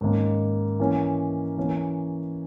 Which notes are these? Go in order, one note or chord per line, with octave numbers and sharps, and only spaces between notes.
G#2 D#3 A#3 C#4
E3 A#3 C#4
E3 A#3 C#4